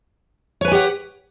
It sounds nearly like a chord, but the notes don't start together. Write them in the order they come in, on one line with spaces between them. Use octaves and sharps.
C#5 B4 G#5 G4 F#5